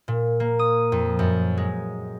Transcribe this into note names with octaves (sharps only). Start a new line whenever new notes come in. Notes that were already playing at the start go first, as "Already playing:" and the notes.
A#2
A#3
D#6
F2
F#2
G#3